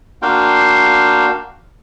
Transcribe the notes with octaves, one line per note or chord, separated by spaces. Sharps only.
A#3 D4 F#4 F5 G5 C6